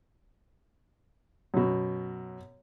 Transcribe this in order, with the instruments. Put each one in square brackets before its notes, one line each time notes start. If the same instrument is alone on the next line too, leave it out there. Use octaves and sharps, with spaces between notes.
[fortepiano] F#2 B2